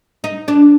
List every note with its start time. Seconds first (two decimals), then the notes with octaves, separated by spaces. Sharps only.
0.24 D#4
0.48 D4